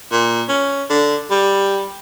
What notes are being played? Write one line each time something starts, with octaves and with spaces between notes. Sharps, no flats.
A#2
C#4
D3
G3